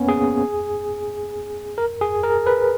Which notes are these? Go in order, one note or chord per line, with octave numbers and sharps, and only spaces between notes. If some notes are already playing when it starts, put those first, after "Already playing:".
Already playing: A#3 B3 C#4
G#4
A#4
G#4
A#4
B4